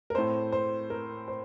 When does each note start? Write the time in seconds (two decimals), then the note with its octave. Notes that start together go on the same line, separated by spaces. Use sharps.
0.10 A#4
0.15 A2 A3 C4 C5
0.52 C5
0.90 A#4
1.28 C5